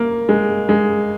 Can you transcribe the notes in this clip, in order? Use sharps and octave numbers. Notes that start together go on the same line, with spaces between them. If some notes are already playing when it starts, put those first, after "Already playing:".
Already playing: A#3
G#3
G#3